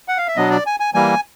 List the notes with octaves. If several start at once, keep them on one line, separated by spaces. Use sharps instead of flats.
F#5
F5
E5
B2 F#3 B3 D4 D#5
D5
G#5
G#5
E3 G3 A#3 G#5